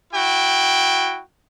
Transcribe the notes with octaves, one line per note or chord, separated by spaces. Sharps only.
E4 F#4 G5